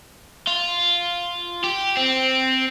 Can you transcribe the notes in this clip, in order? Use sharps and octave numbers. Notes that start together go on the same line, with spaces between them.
F4
G4
C4